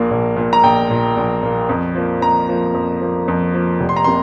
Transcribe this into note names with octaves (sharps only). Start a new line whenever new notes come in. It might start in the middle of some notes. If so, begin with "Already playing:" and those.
Already playing: A#1 A#2 A#3
A#1
A#2 A#3
A#5
A#1 G5
A#2 A#3
A#1
A#2 A#3
F2
F3 A#3
F2 A#5
F3 A#3
F2
F3 A#3
F2
F3 A#3
F1
C6
A#5
C3 A#3 C6